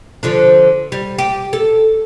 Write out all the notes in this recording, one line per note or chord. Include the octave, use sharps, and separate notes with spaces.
D3 F3 D4
G3
G4
A4